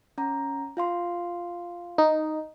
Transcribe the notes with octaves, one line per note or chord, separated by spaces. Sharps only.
C#4 A#5
F4 F5 C6
D#4